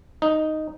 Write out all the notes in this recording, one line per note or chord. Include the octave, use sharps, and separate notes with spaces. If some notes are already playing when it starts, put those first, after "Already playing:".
D#4